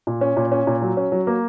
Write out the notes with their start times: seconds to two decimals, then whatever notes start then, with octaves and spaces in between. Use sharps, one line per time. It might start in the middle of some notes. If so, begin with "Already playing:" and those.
0.07 A#2
0.21 C#4
0.37 A#2
0.52 C#4
0.67 A#2
0.82 F#3
0.97 C#4
1.12 F#3
1.27 A#3